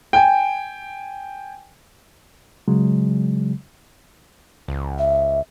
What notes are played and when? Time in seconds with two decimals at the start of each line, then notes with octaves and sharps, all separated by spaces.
0.13 G5 G#5
2.68 C#3 F#3 G#3
4.68 C#2
4.99 E5